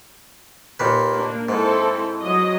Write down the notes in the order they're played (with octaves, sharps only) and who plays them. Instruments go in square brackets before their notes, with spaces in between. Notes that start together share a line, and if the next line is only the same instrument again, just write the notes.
[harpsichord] D#2 A#2 B4
[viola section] A#3 D4
[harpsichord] G#2 [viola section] C4 E4 A4
[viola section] F#3 D#5